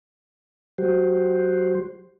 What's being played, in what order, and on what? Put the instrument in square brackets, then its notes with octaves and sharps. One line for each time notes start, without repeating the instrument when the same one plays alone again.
[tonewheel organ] F#3 F#4 G4 C5